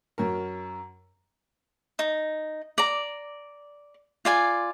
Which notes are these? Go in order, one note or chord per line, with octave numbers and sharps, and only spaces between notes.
F#2 C#4 A#4
D#4
D5 A#5
F4 D5 G#5